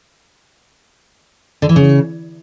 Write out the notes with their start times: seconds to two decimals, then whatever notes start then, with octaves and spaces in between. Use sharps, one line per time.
1.62 D3
1.69 E3
1.76 C#3